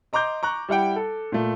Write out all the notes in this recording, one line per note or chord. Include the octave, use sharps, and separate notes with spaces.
D#5 A#5 C6 D6 G6
A#5 C#6 F#6
G3 E4 F#5 G5
A4
A#2 A3